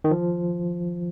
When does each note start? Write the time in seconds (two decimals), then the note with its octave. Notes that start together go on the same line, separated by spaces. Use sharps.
0.04 D#3
0.11 F3